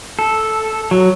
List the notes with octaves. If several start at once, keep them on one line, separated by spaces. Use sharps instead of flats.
A4
F#3